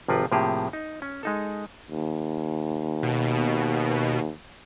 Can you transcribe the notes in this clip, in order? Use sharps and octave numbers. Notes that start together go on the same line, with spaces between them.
G#1 C3 F3 F4 A#4 B4
A2 C3 F3 A#3 G4 G#4
D#4
C#4
G#3 D#4 A4
D#2
B2